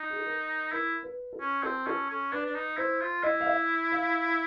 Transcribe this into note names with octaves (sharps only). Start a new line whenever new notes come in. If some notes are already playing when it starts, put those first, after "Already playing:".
Already playing: D#4
G#4
A4
A#4
E4 A#4
B4
A4
C#4
C4 A4
C#4 A4
C#4
D4 B4
D4
D#4
E4 C5
F4
E4 D#5
F5
E5
F5